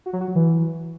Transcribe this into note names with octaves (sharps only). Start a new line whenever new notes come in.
F#4
F#3
F#4
F#3
E3